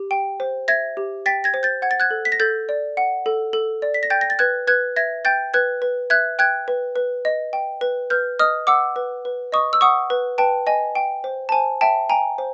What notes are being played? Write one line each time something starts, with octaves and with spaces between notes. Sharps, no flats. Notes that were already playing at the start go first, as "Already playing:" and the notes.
Already playing: G4
G5
C5
E5 G#6 A#6
G4
G5 A6 B6
G#6 A#6
C5
G6 A6
F#5 G#6
A6
F#6 G#6
A4
B6
A#6
A4 G6 A6
D5
F#5
A4
A4
D5
B6
A#6
G5 G6 A6
A#6
A6
B4 F#6 G#6
B4 F#6 G#6
E5 G#6 A#6
G5 G6 A6
B4 F#6 G#6
B4
E5 F#6 G#6
G5 F#6 G#6
B4
B4
D#5
G5
B4
B4 F6 G6
D#5 D#6 F6
F#5 D6 E6
B4
B4
D#5 C#6 D#6
E6
F#5 C#6 D#6
B4
B4 G5 A5
D#5 G#5
G5
C5
A5
C5 G#5
E5 G5 A5
G5 G#5 A#5
C5